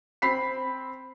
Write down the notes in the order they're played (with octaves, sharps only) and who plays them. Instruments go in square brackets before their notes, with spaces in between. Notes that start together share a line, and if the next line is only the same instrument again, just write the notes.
[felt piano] C4 B5 B6 C7